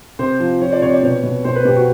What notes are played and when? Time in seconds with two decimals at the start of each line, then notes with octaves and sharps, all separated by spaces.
0.19 C3 C5
0.40 F3
0.61 F3 C#5
0.72 D5
0.82 C3 C#5
0.93 D5
1.03 B2 C#5
1.23 B2
1.44 B2 C5
1.56 B4
1.65 B2 G4
1.76 F#4